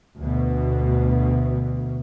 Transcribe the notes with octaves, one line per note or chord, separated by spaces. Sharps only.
D2 B2